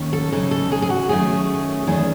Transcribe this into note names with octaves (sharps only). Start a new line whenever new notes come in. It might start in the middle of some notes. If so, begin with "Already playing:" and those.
Already playing: D#2 D#3 C#4
A4
F#2 C#3 G#3 D#4 A4
A4
G#4
G#4
F#4
F#2 D#3 A3 C#4 G#4
E2 D#3 A3 C#4 G#4